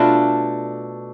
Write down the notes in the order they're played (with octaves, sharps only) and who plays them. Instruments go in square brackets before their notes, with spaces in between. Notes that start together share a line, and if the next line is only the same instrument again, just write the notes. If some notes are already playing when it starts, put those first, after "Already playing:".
Already playing: [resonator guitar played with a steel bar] B2 A3 D4 [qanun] F4 A4 B4